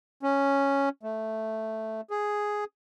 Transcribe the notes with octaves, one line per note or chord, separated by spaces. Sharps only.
C#4
A3
G#4